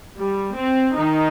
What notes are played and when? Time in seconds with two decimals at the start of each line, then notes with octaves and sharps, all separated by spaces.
0.16 G3
0.54 C4
0.94 D#3 D#4